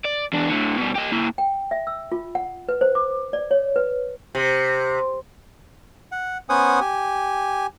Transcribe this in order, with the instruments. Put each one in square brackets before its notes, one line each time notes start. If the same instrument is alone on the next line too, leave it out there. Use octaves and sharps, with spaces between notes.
[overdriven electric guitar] D5
E2 D4
A2 D3
B2 G3
G4 D#5
A#3 E4
[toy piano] G5
E5
E6
F4
F#5
B4
C5
D6
D5
C#5
B4
[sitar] C3
[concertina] F#5
B3 C#4 C5 F#5 G#5 D#6
G4 G#5